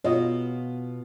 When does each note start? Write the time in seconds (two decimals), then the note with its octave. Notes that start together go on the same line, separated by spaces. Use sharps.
0.04 B2 F4 C#5 D#5